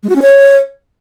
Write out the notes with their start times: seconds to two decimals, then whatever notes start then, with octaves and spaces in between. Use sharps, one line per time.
0.03 G#3
0.09 F#4
0.16 C#4
0.22 C#5